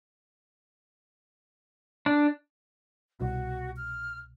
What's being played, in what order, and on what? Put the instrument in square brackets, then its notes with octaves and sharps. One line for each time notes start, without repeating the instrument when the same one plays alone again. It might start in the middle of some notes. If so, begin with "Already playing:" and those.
[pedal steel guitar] D4
[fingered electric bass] C2 B2 [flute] F#4
[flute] F6